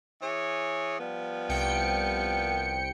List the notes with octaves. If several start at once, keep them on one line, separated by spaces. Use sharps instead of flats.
E3 G#4 C#5
F3 G3 B3
C2 G5 C#7